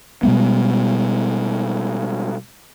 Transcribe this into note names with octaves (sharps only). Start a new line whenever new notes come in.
B2 G3 G#3 B3